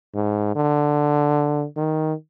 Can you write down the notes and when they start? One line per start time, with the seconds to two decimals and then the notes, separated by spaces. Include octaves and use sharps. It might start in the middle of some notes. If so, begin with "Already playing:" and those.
0.14 G#2
0.56 D3
1.77 D#3